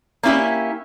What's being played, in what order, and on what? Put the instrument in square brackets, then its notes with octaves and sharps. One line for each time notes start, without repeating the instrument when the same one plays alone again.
[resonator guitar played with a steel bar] A#3 C#4 E4 G4